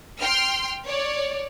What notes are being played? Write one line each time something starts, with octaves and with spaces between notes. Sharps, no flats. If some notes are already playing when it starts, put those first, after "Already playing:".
G5 C6 F6
C#5 D5